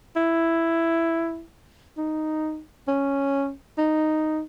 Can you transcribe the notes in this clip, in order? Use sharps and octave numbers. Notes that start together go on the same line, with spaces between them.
E4
D#4
C#4
D#4